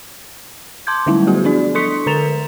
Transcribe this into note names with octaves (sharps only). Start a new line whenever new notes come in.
A5 C6 D6 G6 G#6
D3 F#3 G3 A3 E4
A3 B3 F#4 G#4
F3 B3 D4 D5
A4 C6 C#6 D#6 B6 C#7
D3 A#4 A#5 A6 E7 F7